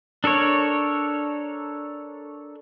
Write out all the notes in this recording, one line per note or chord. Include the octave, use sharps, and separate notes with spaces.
D4 A4 A#4 C#5